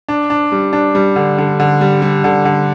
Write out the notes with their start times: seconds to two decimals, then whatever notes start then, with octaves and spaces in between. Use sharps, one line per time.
0.08 D4
0.30 D4
0.52 G3
0.73 D4
0.95 G3
1.16 D3
1.38 D3
1.60 D3
1.81 G3
2.02 G3
2.24 D3
2.45 D3